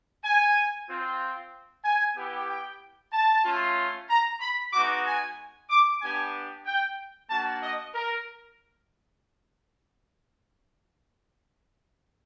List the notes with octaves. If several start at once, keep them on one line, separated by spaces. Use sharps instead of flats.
G#5
C4 F4
G#5
B3 E4 G4
G5
A5
A3 C#4 F4
A#5
B5
G#3 B3 D#4 F#4 D6
G#5
D6
B3 D4 G4 G#5
G5
A#3 D4 F#4 A5
D#5
A#4